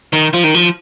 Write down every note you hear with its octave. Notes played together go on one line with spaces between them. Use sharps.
D#3
F3
D#3
F3